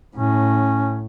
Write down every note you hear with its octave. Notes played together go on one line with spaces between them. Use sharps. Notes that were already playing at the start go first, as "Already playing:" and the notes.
A2 C#4